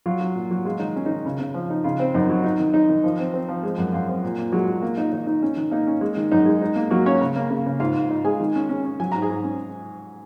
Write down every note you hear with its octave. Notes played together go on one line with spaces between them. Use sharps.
F#3 F4
F#3
A#2
F#3
G#3 F4
D#3 D#4
C#4
D#3 D#4
C#3
C#3
F3
D#4
C#3 F4
C4
F#2 D#4
F#3
D#4
D#3
D#4
D#3
F3
C4
C4
F3
G#3
F#2
F#2 F4
C4
A#2
A#2
F#3 G#3 F#4
A#2
A#3
A#3 D#4
D#3 D#4
D#4
C#4
D#3
A#3 D#4
C#4
G#3
D#3
F#2 D#4
G#3
D#4
A#3
F#3 A#3 F#4
A#3 C#4 C#5
C#3
A#3
C#3
C#3
G#2 F4 F5
G#2
D#4
G#3 G#4 G#5
D#3
C#4
C#4
C#4
F#3 G#5
G#2 A#5
G#4 G#5
G#2
C#4